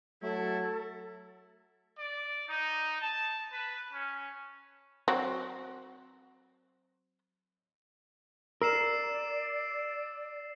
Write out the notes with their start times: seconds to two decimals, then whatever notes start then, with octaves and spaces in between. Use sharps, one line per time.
0.23 F#3 A3 E4 A4
1.98 D5
2.49 D#4
3.00 A5
3.52 B4
3.93 C#4
5.08 F#3 C4 F#4
8.62 A#4 D5 E6 C7 E7